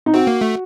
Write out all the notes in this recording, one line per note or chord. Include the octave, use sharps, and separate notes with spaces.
D#4
C4 F#4
A#3
A3